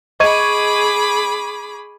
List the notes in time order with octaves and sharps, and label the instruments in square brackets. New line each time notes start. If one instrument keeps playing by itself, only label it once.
[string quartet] G#4 B5 D6 [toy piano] D#5 [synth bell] C#6 G#6 D#7